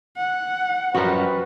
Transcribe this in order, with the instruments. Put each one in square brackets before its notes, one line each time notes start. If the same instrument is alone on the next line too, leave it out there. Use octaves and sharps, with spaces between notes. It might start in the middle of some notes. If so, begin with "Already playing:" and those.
[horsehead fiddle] F#5
[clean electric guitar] F#2 F3 G3 [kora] F#4 A#4 [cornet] B4